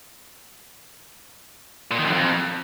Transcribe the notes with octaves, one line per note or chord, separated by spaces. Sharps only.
A#2
D#3
F#2
F2